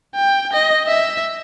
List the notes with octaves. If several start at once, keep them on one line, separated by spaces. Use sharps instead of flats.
G5
D#5
E5